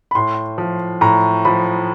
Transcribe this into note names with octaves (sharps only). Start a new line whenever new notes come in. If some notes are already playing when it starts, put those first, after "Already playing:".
B5
A2 C6
F3
A2 A#5
F3 B5